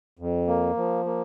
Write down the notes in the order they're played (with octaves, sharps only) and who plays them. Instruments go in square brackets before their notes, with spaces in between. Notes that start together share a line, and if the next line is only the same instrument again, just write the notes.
[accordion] F2
A#3
F3
A#3